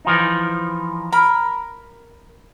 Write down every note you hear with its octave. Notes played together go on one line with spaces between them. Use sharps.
E3 F3 D#4
A#4 B5